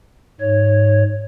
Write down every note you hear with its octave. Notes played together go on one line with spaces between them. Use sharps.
G#2 C#5